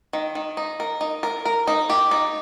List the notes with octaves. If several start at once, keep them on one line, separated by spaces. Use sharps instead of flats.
D#3
D#3
D#4
A#4
D#4
A#4
A#4
D#4
G4
D#4